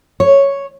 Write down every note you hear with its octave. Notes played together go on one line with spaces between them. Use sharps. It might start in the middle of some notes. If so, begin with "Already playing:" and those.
C#5